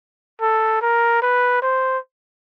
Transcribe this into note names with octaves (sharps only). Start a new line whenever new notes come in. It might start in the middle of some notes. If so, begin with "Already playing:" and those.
A4
A#4
B4
C5